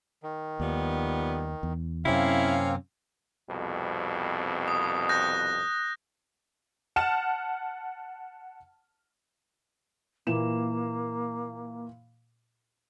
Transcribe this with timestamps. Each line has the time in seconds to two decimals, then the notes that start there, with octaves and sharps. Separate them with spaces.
0.23 D#3
0.60 D#2 F3 G3 B3
1.63 E2
2.05 F#2 C3 A#3 C4 C#4 E4 F5
3.49 C2 F2 B2
4.68 D#6
5.09 F#6 G6 A#6
6.96 F#5 A5 F6 E7
10.27 A#2 E3 A#3 E7